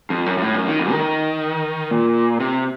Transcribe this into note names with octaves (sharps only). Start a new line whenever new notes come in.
F2
F#2
F#2
A2
F#2
D#3
F2
D#3
A#2
C3